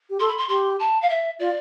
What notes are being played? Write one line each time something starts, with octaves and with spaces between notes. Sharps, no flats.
G4
A4 C6
B5
C6
G4 C6
A5
F5
E5
F4 D5